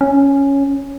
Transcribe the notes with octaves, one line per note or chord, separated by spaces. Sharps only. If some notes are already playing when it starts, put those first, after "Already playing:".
C#4